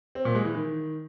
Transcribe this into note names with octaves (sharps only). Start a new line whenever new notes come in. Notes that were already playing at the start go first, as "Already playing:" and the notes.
C4
A#2
G#3
E3
D#3